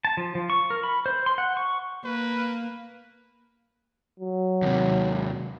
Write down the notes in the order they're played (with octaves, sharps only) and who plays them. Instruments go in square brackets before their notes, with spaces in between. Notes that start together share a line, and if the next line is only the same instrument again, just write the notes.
[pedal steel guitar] A5
F3
F3
C#6
A#4
B5
C5
C6
F#5
C#6
[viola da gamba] A#3 [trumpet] B4
[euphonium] F#3
[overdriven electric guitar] D#2 C3